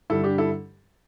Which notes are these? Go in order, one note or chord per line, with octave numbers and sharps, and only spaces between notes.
G2 D3 G3 E4 A4
D4 G4
E4 A4